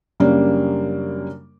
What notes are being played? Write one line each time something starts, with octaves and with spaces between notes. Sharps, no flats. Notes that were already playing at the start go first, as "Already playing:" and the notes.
F#2 C#3 G3 A#3 D4